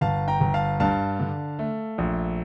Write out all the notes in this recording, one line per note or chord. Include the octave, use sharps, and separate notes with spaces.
G1 F5 A5
G5 A#5
G1
F5 A5
G2 F5 A5
D3
A3
A#1